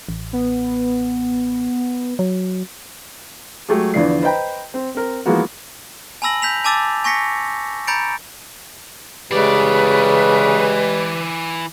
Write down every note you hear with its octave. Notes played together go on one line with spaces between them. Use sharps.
A1
B3
F#3
F#3 G#3 A3 G4 G#4
E2 D3 E3 F3 D5 C7
B4 C5 D#5 G5 A#5 B5
C4
C4 A#4
E3 F3 G#3 A#3 B3 F#4
G#5 A5 B5 E6 A#6 F#7
G6 B6 F7
G#5 A5 D6 E6 A6
G#5 C#6 A#6 B6 C#7
A#5 B5 G6 A6 C#7 D7
C#3 E3 G3 G#3 B4 D5